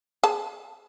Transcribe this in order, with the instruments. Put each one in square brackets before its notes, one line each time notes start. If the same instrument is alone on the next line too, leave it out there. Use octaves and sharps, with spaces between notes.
[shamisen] G#4 A5